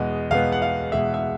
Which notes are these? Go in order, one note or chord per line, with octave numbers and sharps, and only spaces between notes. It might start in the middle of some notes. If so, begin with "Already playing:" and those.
Already playing: E2 B2 G#3 B3 D#5
E2 B2 G#3 B3 F5
F#5
F5
E2 B2 G#3 B3 E5
E5